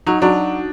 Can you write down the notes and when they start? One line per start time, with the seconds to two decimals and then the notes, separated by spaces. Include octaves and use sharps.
0.07 F#3 D#4
0.22 F#3 D4